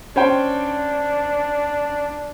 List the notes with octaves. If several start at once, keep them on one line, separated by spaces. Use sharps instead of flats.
C#4 D4 C5 G5